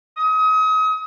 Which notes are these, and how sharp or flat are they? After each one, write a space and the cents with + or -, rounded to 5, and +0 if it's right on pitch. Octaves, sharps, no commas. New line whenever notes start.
D#6 +35